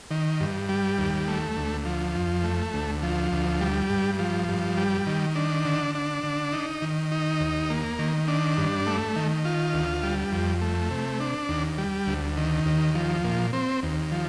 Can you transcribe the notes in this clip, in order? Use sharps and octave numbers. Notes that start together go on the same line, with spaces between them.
D#3
G2
G3
D#2
A3
D2
F3
F2
A3
D2
F3
D2
G3
G2
F3
G2
G3
D#3
D4
D3
D4
D3
D#4
D#3
D#4
D#2
A#3
D#3
D4
G2
A3
D#3
F4
D2
G3
F2
A3
C3
D4
D#2
G3
D2
D#3
D#2
F3
A#2
C4
D#2
F3